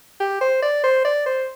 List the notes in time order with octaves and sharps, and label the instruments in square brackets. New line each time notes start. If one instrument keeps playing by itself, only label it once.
[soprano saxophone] G4
C5
D5
C5
D5
C5